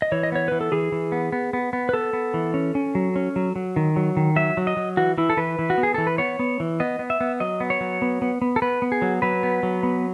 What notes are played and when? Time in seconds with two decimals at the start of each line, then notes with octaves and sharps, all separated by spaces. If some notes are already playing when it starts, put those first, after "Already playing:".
0.02 D#5
0.12 E3 C#5
0.23 D#5
0.32 B3 C#5
0.48 E3 B4
0.61 A4
0.72 E3 G#4
0.92 E3
1.12 B3
1.32 B3
1.53 B3
1.73 B3
1.89 B4
1.93 B3 A4
2.13 B3
2.34 E3
2.54 C#4
2.75 C#4
2.95 F#3
3.16 C#4
3.36 F#3
3.56 F#3
3.76 D#3
3.96 F#3
4.17 D#3
4.36 F#3 E5
4.57 F#3
4.67 D#5
4.77 F#3
4.97 E3 F#4
5.18 E3 E4
5.30 A4
5.37 E3 B4
5.59 E3
5.70 F#4
5.78 B3
5.83 G#4
5.94 E3 A4
6.07 B4
6.18 B3 C#5
6.39 B3
6.60 E3
6.80 B3 D#5
6.99 B3
7.10 E5
7.21 B3
7.40 F#3 D#5
7.60 B3
7.70 C#5
7.81 F#3
8.02 B3
8.22 B3
8.42 B3
8.56 A4
8.62 B3 B4
8.82 B3
8.92 G#4
9.02 F#3
9.22 F#3 B4
9.43 B3
9.63 F#3
9.83 B3